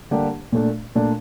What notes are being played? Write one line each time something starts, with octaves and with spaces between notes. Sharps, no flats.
D3 G3 A#3 D4 G4
A#2 A3 D4
A#2 A3 D4